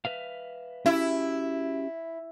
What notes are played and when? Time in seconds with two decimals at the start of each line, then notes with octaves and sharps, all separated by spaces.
0.05 B4 E5 F5
0.86 C#4 E4 F#4 G4